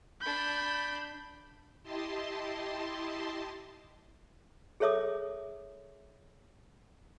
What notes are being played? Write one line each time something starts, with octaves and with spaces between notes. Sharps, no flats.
D4 B5 G6
E4 G4 D#5 A5 C6
G#4 A4 C#5 E5 D6 D#6